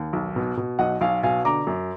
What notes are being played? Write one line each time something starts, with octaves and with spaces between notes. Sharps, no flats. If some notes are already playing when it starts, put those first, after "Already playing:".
Already playing: D#2
B1
B2
B2
B1 D#5 F#5
B1 F5 G#5
B2 F5 G#5
D3 A#5 D6
F#2